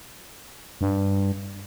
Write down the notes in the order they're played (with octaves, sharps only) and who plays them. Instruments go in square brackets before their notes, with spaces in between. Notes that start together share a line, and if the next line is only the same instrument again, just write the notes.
[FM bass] G2